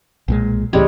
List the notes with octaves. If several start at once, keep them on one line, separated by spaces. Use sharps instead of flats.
B1 A#2 G#3
C#2 A2 E3 G3 G#3 C#4